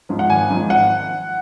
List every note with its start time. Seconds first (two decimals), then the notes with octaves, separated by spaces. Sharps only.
0.09 G#2 F3
0.19 F#5
0.29 G#1 G#5
0.50 G#2 F3
0.70 G#1 F#5